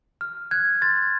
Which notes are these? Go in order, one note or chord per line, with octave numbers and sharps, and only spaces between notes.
F6
F#6 G#6
C6 A6